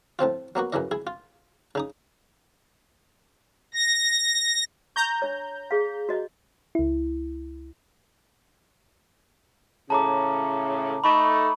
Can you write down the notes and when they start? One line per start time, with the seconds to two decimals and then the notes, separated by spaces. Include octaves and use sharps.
0.19 A2 F3 C4 F4
0.55 F#3 A#3 B3 F#4
0.73 F#2 C#3 E3 D#5
0.91 E4 G#4
1.07 F4
1.75 C#3 D#4 D#6
3.74 A#6
4.96 A#5 C#6 G6
5.22 D4 C#5
5.71 G#4 F5
6.09 F#4 D#5
6.75 C#2 E4
9.90 A2 C#3 A5 A#5 D6
11.04 A3 D#4 B5 C#6